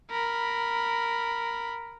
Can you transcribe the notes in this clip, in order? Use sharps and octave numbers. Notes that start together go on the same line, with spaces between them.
A#4 B5